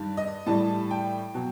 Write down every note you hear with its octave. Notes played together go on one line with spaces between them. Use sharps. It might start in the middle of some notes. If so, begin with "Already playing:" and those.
Already playing: G2 D#3 G3
D#5
A2 E3 G3 A5
G5
B2 F#3